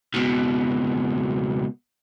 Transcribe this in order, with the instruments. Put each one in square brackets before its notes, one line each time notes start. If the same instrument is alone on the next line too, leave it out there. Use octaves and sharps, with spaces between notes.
[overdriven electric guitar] C#2 B2